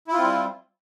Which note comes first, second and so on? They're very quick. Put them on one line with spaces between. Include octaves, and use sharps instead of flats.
E4 F4 C4 G3